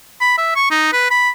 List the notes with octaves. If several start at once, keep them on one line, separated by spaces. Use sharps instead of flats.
B5
E5
C#6
D#4
B4
B5